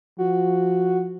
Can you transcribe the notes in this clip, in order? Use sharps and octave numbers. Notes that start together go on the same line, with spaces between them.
F3 F#4